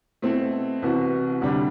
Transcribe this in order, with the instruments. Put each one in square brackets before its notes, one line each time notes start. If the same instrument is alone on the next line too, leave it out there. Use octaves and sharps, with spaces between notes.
[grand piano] B2 A3 C4 E4 A4
C2 C3 E3 B3 F#4
D2 C3 G3 D4 G4